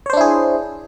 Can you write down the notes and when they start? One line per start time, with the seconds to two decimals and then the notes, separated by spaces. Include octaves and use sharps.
0.06 C#5
0.10 C5
0.13 D4
0.17 E4
0.21 G#4